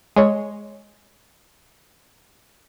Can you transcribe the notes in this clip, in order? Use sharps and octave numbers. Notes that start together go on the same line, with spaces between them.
G#3 C#5